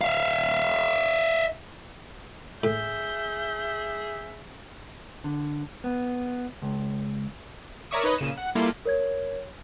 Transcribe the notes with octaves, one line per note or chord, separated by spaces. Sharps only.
E5 F5
A2 G#4 E5 G6
D3
B3
C#2
A#4 C#5 D5 E5 C#6 D#6
D#4 B4 C#5 D#5 B5
A#2 C#3 D#7 E7
F#5
G3 A#3 E4 F4 A4
A#4 C#5 G#6